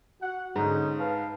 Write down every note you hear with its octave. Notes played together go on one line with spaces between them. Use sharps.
F#4 F#5
G#2 D3 C#4 D#4
B4 F5 A5